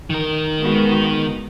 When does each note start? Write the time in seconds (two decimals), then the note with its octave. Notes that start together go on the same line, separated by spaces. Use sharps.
0.10 D#3 A#4
0.58 G#3 B3 F#4